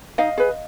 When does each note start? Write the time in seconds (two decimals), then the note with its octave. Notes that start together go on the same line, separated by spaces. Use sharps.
0.18 D#4 D#5 F5
0.38 G#4 B4